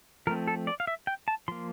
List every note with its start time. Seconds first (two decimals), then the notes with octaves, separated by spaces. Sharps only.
0.27 F3 A3 C4 A#4
0.48 A4
0.67 D5
0.80 F5
0.87 E5
1.07 G5
1.28 A5
1.48 F3 A#3 C6